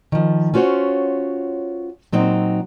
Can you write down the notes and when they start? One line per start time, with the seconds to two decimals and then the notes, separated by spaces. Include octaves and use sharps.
0.12 D#3 F3
0.54 C#4 F4 F#4 C5 C#5
2.12 A#2 F#3 C4 D#4